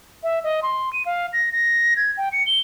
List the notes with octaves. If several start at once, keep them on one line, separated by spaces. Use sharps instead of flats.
E5
D#5
C6
D#7
F5
A#6
A#6
G#6
G5
C#7
G7